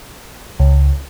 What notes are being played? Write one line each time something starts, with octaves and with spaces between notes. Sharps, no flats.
C#2